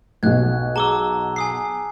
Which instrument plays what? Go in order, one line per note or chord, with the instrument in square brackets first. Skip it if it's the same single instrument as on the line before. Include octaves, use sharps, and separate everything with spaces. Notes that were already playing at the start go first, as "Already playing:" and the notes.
[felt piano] B1 B2 [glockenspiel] F#6 G#6
[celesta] G#4 A#5 G7 [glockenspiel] A5 D6 E6
[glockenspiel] G#5 D#6 C7